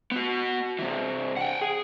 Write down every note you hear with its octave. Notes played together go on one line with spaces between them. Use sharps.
B3 F#4
C3 E3
F#5 G5
G#4